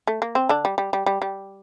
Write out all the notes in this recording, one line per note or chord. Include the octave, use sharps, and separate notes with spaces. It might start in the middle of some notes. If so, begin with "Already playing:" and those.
A3
A#3
C4
D3 D4
G3
G3
G3
G3
G3